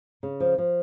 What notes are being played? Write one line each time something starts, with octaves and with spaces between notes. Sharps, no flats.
C#3
F3
F3